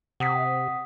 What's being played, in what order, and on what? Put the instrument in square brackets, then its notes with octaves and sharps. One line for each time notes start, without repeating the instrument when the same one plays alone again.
[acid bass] C3 [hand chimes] F#5 D#6 B6